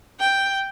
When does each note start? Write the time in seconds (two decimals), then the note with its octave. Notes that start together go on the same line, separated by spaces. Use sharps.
0.20 G5